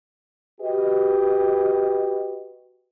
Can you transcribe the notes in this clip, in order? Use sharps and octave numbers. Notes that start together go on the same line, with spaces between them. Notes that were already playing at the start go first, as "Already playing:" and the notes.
F#4 G4 B4 D#5